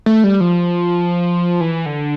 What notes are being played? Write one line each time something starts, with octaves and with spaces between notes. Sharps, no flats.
A3
G3
F3
E3
D3